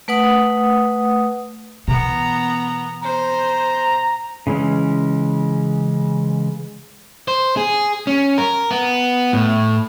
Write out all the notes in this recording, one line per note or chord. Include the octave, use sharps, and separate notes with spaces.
A3 B4 F#5 D#6
B2 E3 B3 A#5
C5 A#5
C#3 E3 G#3 C#4
C5
G#4
C#4
A#4
B3
A2